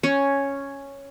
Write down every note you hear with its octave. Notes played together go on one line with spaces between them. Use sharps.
C#4